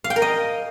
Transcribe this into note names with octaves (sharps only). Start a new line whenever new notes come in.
F5
G5
A#4
D#5